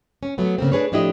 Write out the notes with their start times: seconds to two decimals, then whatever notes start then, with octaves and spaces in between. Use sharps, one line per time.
0.23 C#4
0.38 F#3 A3 B3
0.58 C#3 A#3 C4
0.72 D4 G#4 B4 C#5
0.92 A2 F3 D4 E4 G4 D#5